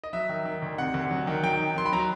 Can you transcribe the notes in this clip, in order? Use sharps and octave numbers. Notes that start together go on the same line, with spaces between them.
D#5
F#3 E5
D#3
D#3
D2
C3 F#5
D2
F#3
D#3
F#3 G5
D#3
F#3 C6
B5
F#3 A#5